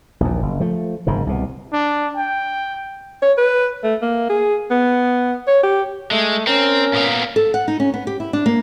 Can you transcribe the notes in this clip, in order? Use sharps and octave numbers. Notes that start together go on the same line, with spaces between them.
A#1 D#2
F#1
F3 A3
F#1 G#2 D#3
C2 B2
D4
G5
C#5
B4
A3
A#3
G#4
B3
C#5
G4
G#3 A3
C4 C#4 A#4
A#2 B3 F5
A4
F#5
D#4
C#4
B3
G4
E4
D4
A#3